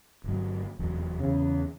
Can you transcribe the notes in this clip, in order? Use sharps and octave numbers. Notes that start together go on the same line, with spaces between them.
G1 F#3
F1 E2 F#3
E2 C#3